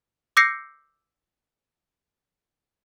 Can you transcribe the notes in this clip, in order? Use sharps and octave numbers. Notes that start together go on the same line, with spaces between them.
D6 E6 G6 A#6 C7 C#7